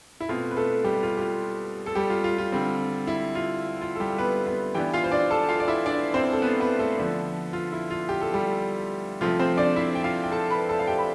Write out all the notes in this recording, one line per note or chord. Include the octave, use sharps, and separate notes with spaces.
E4
B2 A3 C4 F4
B4
A3 A4
G3 G4
F4
G4
F4
A4
G3 G4
F4
F4
F4
D3 G3 C4
E4
F4
F4
A4
G3 G4
A4
B3 B4
B3 B4
E3 B3 D4 G4 G5
F4 F5
C5
D4 D5
A4 A5
F4 F5
D5
E4 E5
D4 D5
C4 C5
A4
B3 B4
B3 B4
A3 A4
D3 F3 B3 D4
F4
E4
F4
G4
A4
G3 G4
C3 F3 A3 C4 F4
C4 C5
D4 D5
E4 E5
G5
F4 F5
G5
A4 A5
B4 B5
A4 A5
F5
G4 G5
B5